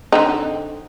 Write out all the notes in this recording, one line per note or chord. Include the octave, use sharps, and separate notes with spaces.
D3 C4 D#4